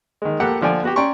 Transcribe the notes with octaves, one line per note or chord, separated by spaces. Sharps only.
D#3 G#3
A#1 G4 A4 A#4 F#5
D3 F3 D5 G5 G#5
B3 F#4 G4
C#4 D5 G5 A#5 C6 C#6